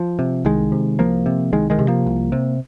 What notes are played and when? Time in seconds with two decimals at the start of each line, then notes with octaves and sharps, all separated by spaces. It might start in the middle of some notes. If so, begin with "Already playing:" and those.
Already playing: F3
0.19 C3
0.45 C2 D#3 G#3
0.72 C3
0.99 C2 F3 A#3
1.26 C3
1.52 C2 D#3 G#3
1.70 D#3 G#3
1.79 C3
1.88 F3 A#3
2.06 C2
2.32 C3